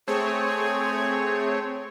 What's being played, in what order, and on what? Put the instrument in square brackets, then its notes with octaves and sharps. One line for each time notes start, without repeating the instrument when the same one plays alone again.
[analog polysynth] A3 C4 C#5 [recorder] G#4